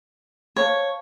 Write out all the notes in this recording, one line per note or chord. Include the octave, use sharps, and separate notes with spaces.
C5 C#5 F5 A5 C#6